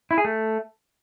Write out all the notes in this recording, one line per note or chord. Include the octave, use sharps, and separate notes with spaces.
E4
G#4
A3